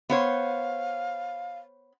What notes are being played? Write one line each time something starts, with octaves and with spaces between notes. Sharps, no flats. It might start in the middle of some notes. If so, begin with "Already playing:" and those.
B3 C5 C#5 F5